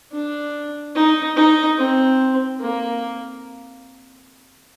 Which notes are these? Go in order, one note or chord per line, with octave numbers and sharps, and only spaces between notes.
D4
D#4
D#4
C4
A#3